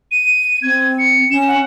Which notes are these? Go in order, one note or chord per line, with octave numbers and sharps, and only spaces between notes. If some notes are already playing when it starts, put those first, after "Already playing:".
D#7
C4 G#6
C#7
C#4 E7
F#5